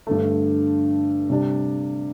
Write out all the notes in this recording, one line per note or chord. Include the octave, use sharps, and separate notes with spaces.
G2 D3 A3
C3 G3 D4